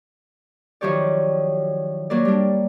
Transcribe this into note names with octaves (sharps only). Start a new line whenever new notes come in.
D#3 F3 F#3 G4 C#5 D5
F#3 A#3 A#4 D5
G3 D4